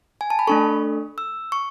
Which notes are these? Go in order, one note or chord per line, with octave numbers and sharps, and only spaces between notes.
G#5
A5
B5
A3 D4 A4 C#6
E6
C#6